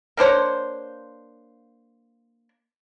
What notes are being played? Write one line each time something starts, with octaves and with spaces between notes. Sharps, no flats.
A#3 D4 C5 C#5